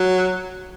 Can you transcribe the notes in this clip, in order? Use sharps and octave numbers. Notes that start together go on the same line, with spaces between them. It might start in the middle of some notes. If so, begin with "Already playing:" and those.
Already playing: F#3